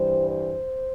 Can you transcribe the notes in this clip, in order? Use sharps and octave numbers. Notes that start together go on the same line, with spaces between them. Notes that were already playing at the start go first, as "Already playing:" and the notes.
Already playing: G2 E3 G3 C5
C5